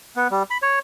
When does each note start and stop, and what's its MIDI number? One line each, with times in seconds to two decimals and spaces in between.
0.16 0.28 59
0.31 0.43 55
0.50 0.58 83
0.62 0.79 73